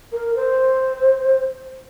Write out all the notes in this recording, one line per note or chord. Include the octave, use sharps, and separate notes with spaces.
A#4
C5